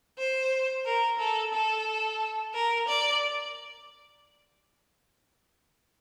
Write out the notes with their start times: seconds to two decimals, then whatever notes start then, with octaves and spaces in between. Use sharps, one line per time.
0.18 C5
0.86 A#4
1.19 A4
1.53 A4
2.54 A#4
2.88 D5